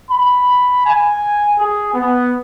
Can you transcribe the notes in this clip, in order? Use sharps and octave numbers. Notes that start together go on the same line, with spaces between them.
B5
G#5
G#4
B3